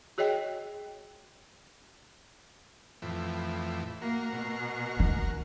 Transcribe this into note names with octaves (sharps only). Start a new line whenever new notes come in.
F#4 G#4 C#5 D#5 G5
F2 A2 E3
A#3 F#4 A#4
B2
D#3